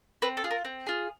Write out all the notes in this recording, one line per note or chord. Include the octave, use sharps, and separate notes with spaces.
C4 B4
A4
F4 G#4
A#4
C4
F4 G#4